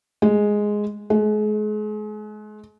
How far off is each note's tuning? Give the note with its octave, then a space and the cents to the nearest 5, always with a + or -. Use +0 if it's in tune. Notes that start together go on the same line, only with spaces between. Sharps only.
G#3 +0
G#3 +35